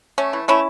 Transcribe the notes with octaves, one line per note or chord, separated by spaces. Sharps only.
A3 C#4
E3
A3 C#4 E4